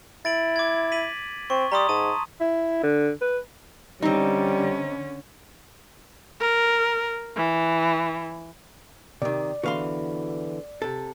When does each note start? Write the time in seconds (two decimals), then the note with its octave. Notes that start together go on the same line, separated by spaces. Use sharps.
0.25 E4 A6 D7 F#7
0.56 D6 G#6
0.92 B6 D#7 F#7
1.50 C4 C#6
1.72 G3 A#5 C6 D#6
1.89 G#2 A5 D#7
2.41 E4
2.83 D3
3.21 B4
4.02 D3 G3 C4 C#4 D#4
6.40 A#4
7.37 E3
9.22 C3 D#3 D5
9.63 E2 D3 E3 F#4 F5 C6
10.82 C3 A4